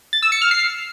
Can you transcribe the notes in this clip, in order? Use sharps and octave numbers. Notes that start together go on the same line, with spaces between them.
A6
E6
C#7
F6
C7